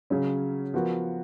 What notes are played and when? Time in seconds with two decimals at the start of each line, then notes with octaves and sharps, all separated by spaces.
0.10 C#3 F#3 C#4
0.74 F3 B3 F#4 A#4